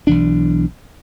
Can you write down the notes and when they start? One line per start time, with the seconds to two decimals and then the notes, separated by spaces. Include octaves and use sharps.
0.07 B1 E3 D4